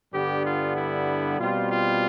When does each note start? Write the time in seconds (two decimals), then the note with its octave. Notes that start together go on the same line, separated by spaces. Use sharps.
0.13 G2 D3 G3 B3 G4
0.45 F4
0.76 E4
1.39 B2 G3 C4 F4
1.71 F4